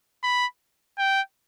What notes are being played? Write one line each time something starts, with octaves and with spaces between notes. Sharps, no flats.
B5
G5